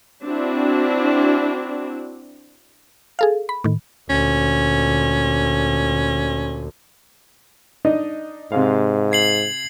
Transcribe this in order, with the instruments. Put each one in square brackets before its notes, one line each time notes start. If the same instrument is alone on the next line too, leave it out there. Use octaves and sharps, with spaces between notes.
[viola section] C4 D4 E4 F#4
[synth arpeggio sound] G#4 A4 F5
B5
A2 D#3
[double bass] D2 A#2 [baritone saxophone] C#4
[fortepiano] D4 D#4 D#5
[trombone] G#2 [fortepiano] C3 F5
[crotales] G#6 C7 F#7